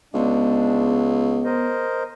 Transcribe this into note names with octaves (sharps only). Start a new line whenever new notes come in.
C#2 G#3 B3 D4
A#4 C5 D#5